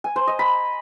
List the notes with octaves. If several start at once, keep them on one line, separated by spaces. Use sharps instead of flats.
G#5
C5
D#5
B5